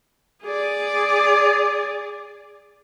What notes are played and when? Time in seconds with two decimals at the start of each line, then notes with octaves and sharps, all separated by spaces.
0.43 G#4 D5